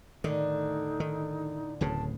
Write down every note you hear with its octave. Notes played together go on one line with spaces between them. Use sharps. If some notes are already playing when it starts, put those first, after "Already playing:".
A2 D3 D#3 D#4
D#3
D1 A2 C#3 A5